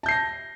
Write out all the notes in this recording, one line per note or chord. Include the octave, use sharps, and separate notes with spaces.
A5 G6 A#6 C7